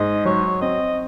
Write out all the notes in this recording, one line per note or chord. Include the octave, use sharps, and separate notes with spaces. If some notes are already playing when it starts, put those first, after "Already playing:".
Already playing: G#2 D#5
F#3 C#5
C4 D#5